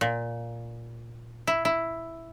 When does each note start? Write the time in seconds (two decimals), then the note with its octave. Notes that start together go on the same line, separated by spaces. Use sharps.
0.01 A#2
1.47 E4
1.65 E4